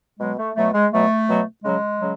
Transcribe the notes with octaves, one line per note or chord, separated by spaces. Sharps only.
B2 F#3 G#3
A3
B2 F#3 A3
G#3
B2 F#3 A3
B2 F#3
C#3 F#3 G#3
C#3 F#3